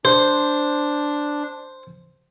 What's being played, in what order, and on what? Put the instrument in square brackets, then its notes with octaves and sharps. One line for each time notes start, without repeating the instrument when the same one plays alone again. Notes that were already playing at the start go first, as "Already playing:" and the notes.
[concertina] D4 [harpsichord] C5